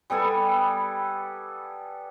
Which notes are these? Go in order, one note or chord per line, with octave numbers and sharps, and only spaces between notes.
G3 B3 A4 G#5